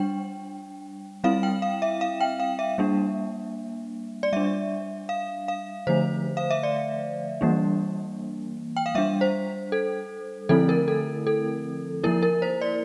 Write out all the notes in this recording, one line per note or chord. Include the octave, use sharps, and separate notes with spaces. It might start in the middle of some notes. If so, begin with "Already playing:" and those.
Already playing: G3 D4 G5
G3 C4 E4 F5
G5
F5
E5
F5
G5
F5
E5
G3 A#3 D4
D5
G3 D4 E5
F5
F5
D3 F3 A3 C5
F5
E5
D5
E3 G3 A#3 D4
G5
F5
G3 D4 E5
C5
A4
D3 F3 A3 C4 E4 A4
A#4
A4
A4
F3 A#3 E4 A#4
A#4
C5
D5